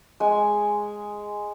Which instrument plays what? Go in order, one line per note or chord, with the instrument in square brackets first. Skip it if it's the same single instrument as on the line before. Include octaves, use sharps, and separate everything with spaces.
[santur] G#3 G#5